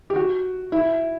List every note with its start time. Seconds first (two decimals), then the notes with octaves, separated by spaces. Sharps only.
0.10 G4
0.16 F#4
0.72 E4